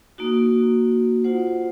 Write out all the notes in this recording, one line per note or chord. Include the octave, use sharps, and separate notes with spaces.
A#3 D#4 F#4
F4 C5 F#5